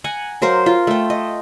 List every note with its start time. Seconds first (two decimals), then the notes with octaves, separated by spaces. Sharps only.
0.04 F#5 G#5 A#5
0.42 F#3 A#4 C5 F5
0.66 F4
0.87 A3 G5
1.10 D#5